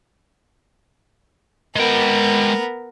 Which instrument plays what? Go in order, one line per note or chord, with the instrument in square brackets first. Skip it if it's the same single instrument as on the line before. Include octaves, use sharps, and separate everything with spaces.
[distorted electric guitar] G#3 G5 [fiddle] B3 A#4